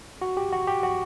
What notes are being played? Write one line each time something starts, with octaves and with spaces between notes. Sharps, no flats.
F#4
G4
F#4
G4
F#4